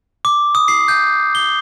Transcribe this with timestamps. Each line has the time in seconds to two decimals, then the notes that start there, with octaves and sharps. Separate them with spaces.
0.25 D6
0.55 D#6
0.68 C7
0.88 G6
1.35 G7